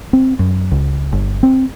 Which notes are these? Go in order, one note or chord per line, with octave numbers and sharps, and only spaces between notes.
C4
F#2
C#2
G1
C4